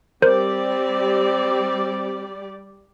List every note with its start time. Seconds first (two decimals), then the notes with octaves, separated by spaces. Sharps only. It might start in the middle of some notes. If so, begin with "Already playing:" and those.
0.22 G3 C4 G4 A#4 C5 D5 G6